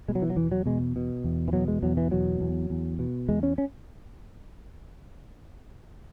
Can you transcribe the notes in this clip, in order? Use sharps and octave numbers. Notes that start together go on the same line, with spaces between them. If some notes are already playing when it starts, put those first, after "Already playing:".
B2 G#3
F#3
E3
F#3
E2 E3
F#3
B2 G#3
B2
E2
E3
B2 F#3
G#3
E2 F#3
E3
B2 F#3
E2
E2
B2
E2 G#3
C#4
C#4